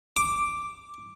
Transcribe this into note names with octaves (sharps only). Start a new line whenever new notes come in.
D6